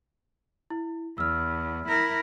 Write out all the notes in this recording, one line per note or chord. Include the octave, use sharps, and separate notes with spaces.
E4
E2 E6 F6
E4 A#4